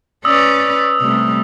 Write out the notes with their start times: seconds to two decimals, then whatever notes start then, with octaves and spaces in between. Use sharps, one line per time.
0.25 C#4 B4 D5 D#6 E6
1.01 C3 G3 A3